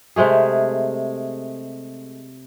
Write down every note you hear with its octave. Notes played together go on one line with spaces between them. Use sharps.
C3 G#3 A3 G#4